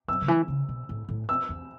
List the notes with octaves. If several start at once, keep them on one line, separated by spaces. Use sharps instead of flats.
F#2 E6
C#3
E3
C#3
B2
A2
A2
E6
E2